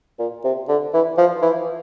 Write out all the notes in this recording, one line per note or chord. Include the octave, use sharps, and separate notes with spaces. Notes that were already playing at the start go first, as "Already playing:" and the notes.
A#2
C3
D3
E3
F3
E3